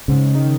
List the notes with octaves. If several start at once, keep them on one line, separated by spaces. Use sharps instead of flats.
G#2 C#3
D#3